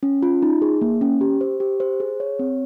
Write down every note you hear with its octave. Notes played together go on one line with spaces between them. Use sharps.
C#4
F4
D#4
G#4
A#3
C#4
G4
C5
G4
C5
G#4
C#5
C4